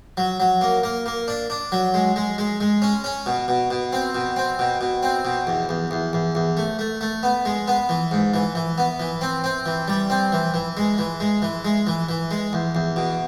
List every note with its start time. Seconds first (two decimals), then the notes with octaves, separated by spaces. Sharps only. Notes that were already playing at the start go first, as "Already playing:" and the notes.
0.17 F#3
0.40 F#3
0.61 A#3
0.83 A#3
1.06 A#3
1.28 D4
1.50 D4
1.72 F#3
1.94 G#3
2.16 G#3
2.38 G#3
2.61 G#3
2.82 C#4
3.04 C#4
3.26 B2
3.48 B2
3.71 B2
3.93 C4
4.15 B2
4.36 C4
4.59 B2
4.81 B2
5.03 C4
5.25 B2
5.47 E2
5.69 E2
5.91 E2
6.13 E2
6.35 E2
6.57 A3
6.79 A3
7.01 A3
7.23 B3
7.45 G#3
7.68 B3
7.89 E3
8.11 G#2
8.34 E3
8.55 E3
8.78 B3
9.00 E3
9.21 C4
9.44 C4
9.66 E3
9.88 G3
10.10 C4
10.32 E3
10.54 E3
10.77 G#3
10.98 E3
11.20 G#3
11.42 E3
11.65 G#3
11.87 E3
12.09 E3
12.31 G#3
12.53 E2
12.75 E2
12.96 B2